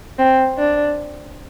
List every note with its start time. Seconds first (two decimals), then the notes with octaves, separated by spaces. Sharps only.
0.19 C4
0.58 D4